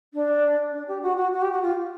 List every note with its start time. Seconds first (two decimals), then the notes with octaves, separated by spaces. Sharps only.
0.13 D4
0.73 D4
0.87 G4
1.02 F#4
1.17 F#4
1.32 F#4
1.42 G4
1.52 F#4
1.62 F4